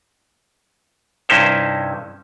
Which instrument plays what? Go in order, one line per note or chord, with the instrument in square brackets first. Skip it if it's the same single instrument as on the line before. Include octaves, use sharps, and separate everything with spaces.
[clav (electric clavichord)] G2 C3 C#4 D#4 E4 C5